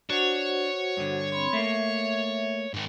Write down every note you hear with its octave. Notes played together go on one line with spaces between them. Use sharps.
D4 F#4 C5 C#5 F#5
G2 D3
C4 B5 C6
A3 A#3 E5
G#2 D#3